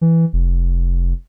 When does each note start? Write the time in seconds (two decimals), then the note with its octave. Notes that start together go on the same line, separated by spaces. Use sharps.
0.01 E3
0.33 F1